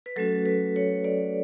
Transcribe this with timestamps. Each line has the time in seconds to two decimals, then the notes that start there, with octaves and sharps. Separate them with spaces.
0.06 B4
0.16 F#3 A3 C#4 F#4 A4
0.46 B4
0.76 C#5
1.04 D5